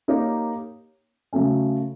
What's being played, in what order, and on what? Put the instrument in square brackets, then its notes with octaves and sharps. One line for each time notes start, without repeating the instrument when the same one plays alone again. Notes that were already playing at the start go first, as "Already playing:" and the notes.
[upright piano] A#3 D#4 G4 A#4 C#5
C#3 F#3 A3 C#4